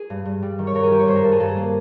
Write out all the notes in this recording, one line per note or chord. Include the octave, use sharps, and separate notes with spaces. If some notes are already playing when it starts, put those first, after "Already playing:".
Already playing: G#4
G2
G2
G3
D#3
C#5
G2 A#4
G#4
D#3 G4
C#5
G2 C5
A#4
G2 A4
G#4
G2 A4
G#4
A#3